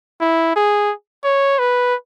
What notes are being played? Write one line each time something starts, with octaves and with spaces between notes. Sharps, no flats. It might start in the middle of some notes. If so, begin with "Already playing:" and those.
E4
G#4
C#5
B4